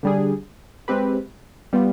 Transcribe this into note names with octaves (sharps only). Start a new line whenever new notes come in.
D3 G3 D4 G#4
G#3 C4 G4 B4
G3 B3 F4